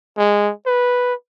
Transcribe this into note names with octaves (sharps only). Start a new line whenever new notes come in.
G#3
B4